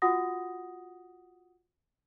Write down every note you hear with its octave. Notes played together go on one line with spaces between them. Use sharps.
F4 F#4 F#5 D#6 A#6